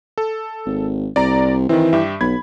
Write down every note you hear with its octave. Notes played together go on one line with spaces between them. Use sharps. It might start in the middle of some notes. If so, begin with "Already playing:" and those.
A4
G#1
C2 D5 A#5
D#3 E3 C4
G2 G4 E5
B1 B5 G#6